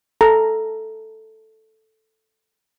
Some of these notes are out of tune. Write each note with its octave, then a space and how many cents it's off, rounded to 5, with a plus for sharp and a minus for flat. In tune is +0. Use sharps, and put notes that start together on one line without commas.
A4 +0 A#5 +0